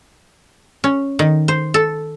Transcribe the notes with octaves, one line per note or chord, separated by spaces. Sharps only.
C#4
D#3
C5
A4